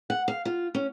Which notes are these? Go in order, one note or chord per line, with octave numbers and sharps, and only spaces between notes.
F#5
F5
F4
C#4